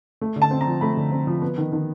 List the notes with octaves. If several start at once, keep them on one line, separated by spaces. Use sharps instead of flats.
A3
D3
A5
C4
A#5
F3
A3 B5
D3
C4
F3
B3
D#3
D#3